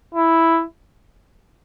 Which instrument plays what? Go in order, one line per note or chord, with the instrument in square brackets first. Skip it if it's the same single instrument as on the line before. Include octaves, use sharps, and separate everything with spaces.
[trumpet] E4